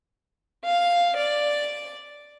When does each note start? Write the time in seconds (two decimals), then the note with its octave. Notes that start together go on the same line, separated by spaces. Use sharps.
0.65 F5
1.17 D5